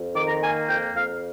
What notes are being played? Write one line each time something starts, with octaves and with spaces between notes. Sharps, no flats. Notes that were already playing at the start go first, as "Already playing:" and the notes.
Already playing: F2
D#3 D6
A#5
A#3 G#5
F2 G5
F2 F5